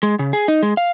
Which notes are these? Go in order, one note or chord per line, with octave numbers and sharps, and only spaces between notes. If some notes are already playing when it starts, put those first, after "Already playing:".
G#3
C#3
G#4
D#4
G#3
F5